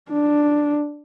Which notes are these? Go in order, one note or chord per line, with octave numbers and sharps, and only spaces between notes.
D4